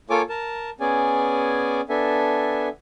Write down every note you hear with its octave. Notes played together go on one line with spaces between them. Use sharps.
A#3 F4 A4 C#5 G#5 D6
A#4 A5
B3 C#4 G#4 D5 G#5
B3 D4 A4 E5 G#5